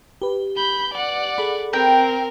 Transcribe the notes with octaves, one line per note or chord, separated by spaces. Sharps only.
G4 B4
B5 G6
D5 F#5
G#4 A4 B5
C4 A#4 G5